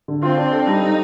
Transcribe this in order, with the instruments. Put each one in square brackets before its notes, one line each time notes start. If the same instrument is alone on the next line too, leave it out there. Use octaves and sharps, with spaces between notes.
[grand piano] D3
[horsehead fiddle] C4 [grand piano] F4
[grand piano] D4
A4
[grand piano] G3 [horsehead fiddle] D#4
[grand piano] G3